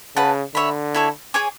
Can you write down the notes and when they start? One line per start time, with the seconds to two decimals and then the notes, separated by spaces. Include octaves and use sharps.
0.16 C#3 B4 F#5 A5
0.54 D3 C#5 E5 B5
0.94 E4 A4 C#5
1.34 G#4 C#5 G#5 D6